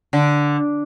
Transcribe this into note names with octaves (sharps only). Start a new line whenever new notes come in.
D3